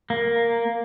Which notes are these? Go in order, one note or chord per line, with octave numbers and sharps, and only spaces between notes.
A#3